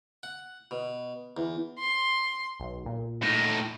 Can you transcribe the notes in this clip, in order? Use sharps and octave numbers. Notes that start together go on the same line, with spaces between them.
F#5
B2
E2
C6
B1
A#2
A2 D#4